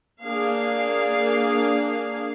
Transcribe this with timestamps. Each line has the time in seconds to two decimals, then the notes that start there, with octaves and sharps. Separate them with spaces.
0.22 A#3 D4 G#4 F5